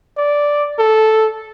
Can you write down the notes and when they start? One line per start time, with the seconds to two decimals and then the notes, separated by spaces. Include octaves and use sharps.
0.17 D5
0.79 A4